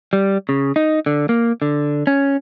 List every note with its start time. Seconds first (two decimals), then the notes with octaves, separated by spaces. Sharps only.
0.13 G3
0.49 C#3
0.76 D#4
1.06 D3
1.29 A#3
1.62 D3
2.07 C#4